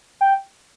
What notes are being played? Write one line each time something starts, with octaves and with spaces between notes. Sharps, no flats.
G5